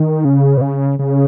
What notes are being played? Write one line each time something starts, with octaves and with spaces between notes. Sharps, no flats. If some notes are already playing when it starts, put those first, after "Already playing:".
Already playing: D#3
C#3
B2
C#3
C#3